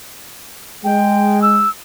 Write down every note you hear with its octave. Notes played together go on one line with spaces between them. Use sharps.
G#3 G5
E6